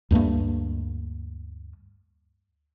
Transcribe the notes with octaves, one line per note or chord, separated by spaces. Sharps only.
D2 G2 A3 A#3